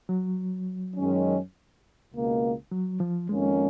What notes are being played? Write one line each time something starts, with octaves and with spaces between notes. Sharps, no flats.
F#3
F#2 D#3 G#3 C#4
C#2 B2 A#3
F#3
F3
F2 D#3 G#3 A#3 C#4